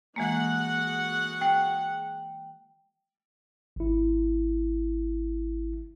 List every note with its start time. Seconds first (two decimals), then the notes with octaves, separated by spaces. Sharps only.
0.16 E3 G#3 A#3 F#4 G#4 F#5
1.41 G5
3.76 G#1 E4